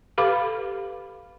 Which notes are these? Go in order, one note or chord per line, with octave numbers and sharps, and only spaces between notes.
G4 A4 B4 F5 B5 D6